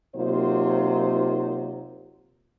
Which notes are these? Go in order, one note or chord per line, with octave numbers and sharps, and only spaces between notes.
C3 F#3 A#3 D#4 F4 C5